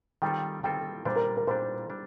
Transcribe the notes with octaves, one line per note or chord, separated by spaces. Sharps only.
D#3 G3 C4 F4 A4 G5
D#3 G3 C4 F4 A4 G5
A#2 G3 D4 C5
A#4
A#4
A#2 G3 D4 C5
G3 D4